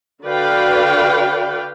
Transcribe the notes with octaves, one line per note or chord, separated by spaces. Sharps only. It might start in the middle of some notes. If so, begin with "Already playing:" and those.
D3 F#4 B4 D5 F5 G5